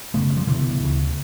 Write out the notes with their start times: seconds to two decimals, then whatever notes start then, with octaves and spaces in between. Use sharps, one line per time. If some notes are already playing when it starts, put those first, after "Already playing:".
0.14 F#2 C#3 A3 B3
0.30 G#3
0.37 F3 G3
0.47 C2 B2 D3 E3
0.82 D2 C#3